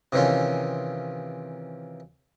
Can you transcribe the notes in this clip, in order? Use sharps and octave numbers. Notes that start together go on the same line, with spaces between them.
C3 D#3 E3 C#4 F4